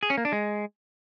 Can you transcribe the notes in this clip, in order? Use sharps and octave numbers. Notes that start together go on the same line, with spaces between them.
G#4
C#4
A#3
D4
G#3